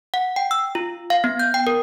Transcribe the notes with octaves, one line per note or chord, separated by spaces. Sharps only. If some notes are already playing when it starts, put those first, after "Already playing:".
F#5
G5
E6
F4
F5
B3
G6
G5
A#4